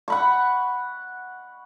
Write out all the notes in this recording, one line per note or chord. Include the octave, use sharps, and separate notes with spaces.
F#5 B5 C#6